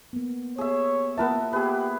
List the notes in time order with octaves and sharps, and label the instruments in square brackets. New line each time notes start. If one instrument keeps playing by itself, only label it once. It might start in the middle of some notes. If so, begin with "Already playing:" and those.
[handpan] A#3 B3
[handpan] B3 G4 [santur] G#4 E5 [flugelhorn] C#5
[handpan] A#3 F4 E5 [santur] B3 A#4 A5
[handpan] B3 [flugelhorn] G4 [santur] G#4 B4